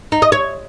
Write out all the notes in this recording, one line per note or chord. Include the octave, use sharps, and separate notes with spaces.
D#4
D#5
C#5